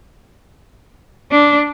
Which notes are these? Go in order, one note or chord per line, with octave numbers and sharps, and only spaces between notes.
D4